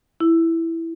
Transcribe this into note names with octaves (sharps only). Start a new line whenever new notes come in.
E4